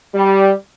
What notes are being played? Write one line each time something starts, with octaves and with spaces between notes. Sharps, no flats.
G3